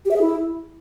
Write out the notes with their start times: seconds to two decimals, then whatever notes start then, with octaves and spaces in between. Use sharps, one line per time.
0.05 G4
0.11 E5
0.16 G#4
0.21 E4